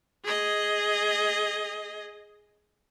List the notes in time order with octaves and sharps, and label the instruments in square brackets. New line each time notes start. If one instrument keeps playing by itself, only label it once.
[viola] G#4 D#5